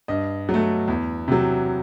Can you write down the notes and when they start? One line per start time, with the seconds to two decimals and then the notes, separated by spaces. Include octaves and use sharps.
0.08 G2 D#5
0.49 F#3 A3
0.88 E2
1.28 C3 F#3